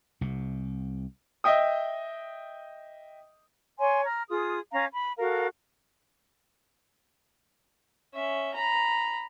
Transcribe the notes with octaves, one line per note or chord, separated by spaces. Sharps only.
C2 C3
D#5 E5 G5 D#6
C#5 G#5 C6
A#5 F6
F4 G#4 D#6
C#4 F5 A#5
B5
F#4 A4 A#4 F5
C#4 E5
A#5 B5